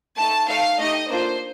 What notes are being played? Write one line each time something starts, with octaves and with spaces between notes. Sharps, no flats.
A3 D#4 A4 A5
A3 D#4 A4 F5
A3 D#4 G4 D#5
A#3 D4 F4 A4 C5